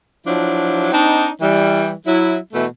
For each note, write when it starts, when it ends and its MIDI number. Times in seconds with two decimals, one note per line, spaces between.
0.26 0.90 53
0.26 0.90 54
0.26 0.90 62
0.26 0.90 64
0.91 1.28 60
0.91 1.28 62
0.91 1.28 63
1.41 1.91 52
1.41 1.91 55
2.05 2.37 54
2.05 2.37 64
2.53 2.66 47
2.53 2.66 52
2.53 2.66 57